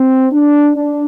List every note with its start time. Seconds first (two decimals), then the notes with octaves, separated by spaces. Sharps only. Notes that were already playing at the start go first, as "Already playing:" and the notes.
Already playing: C4
0.31 D4
0.75 D4